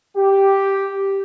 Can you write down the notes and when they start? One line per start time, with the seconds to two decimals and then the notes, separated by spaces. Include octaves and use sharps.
0.17 G4